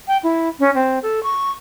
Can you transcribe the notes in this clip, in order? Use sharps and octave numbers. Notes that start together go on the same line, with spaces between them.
G5
E4
C#4
C4
A4
C#6